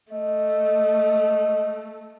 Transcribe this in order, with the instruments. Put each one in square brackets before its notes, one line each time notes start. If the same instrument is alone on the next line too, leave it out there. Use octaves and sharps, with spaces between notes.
[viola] A3 [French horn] D#5